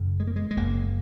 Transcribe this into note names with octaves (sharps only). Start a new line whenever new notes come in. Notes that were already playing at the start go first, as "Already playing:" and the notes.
Already playing: F#1 F#2 C#3
G#3
A#3
G#3
G#3
F#1 F#2 C#3 A#3